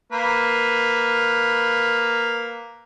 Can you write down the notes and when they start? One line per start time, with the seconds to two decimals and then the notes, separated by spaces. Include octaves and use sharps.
0.12 A#3 B4